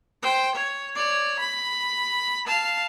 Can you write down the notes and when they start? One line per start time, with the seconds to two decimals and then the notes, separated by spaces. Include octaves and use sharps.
0.23 C5 G5
0.55 C#5
0.95 C#5 D5
1.40 B5
2.47 F5 A5